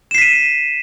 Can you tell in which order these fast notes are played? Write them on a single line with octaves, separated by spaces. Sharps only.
E7 C7 B6 D#7